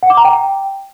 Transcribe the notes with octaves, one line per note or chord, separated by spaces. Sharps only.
F#5
D6
A#5
G5